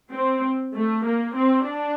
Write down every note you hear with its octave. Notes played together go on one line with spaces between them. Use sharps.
C4
A3
A#3
C4
D4